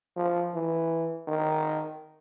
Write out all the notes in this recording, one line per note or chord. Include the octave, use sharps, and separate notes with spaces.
F3
E3
D#3